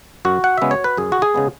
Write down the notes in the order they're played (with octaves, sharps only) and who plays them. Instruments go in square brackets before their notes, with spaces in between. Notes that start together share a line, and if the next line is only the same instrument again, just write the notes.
[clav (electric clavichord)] F#2 F#4
F#5
C#3 G#3 B3 E5
C#5
B4
F#2 G#4
F#4
G#4
C#3 G#3 B3